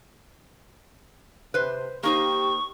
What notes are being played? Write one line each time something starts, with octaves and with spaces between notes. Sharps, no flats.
C3 B4 C5
A#3 D#4 G4 C5 C#6